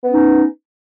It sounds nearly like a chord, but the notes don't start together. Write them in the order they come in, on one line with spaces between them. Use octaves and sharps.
B3 C#4 D#4